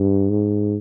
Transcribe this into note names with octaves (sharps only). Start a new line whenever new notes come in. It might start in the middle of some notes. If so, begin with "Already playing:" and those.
Already playing: G2
G#2